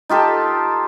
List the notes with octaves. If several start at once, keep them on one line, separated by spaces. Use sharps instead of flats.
D#4 F4 G4 A4